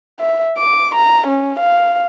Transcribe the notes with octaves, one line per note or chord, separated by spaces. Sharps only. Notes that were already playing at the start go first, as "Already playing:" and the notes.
E5
D6
A#5
C#4
F5